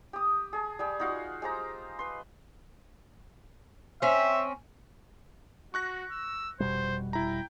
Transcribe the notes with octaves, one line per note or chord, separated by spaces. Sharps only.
G4 D#6
G#4 A5
G3 G#4 G5
D#4 F4 F#4 F5
G#3 G4 C5 A#5
B4 C6
C4 C#4 E5
F#4 C#6 F#6 A#6
E6
F1 B2 G3 C5
E4 G5 A#5